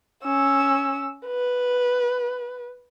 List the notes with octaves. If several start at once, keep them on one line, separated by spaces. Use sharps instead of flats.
C#4 E6
B4